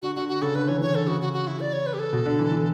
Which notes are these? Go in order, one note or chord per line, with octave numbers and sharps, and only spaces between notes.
D3 F#4
D3 F#4
F#4
C#3 A4
D3 B4
E3 C#5
E3 C#5
D3 A4
C#3 F#4
F#4
F#4
E4
D5
C#5
B4
G4
A4
B2
D3
E3
E3